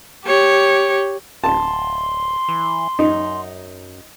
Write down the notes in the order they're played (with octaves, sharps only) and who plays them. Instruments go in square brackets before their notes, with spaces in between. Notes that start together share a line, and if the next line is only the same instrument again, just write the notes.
[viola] G4 C#5
[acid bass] D1 [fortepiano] A5 [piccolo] C6
[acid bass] E3
[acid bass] F#2 [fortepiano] D#4